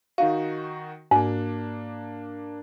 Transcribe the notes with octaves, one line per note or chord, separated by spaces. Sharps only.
D#3 D#4 F#4 F5
G#2 A#3 D4